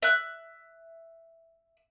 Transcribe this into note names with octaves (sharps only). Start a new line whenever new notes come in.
E5 F#6